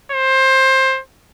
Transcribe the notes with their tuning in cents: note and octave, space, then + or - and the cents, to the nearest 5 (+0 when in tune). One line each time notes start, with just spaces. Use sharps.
C5 +20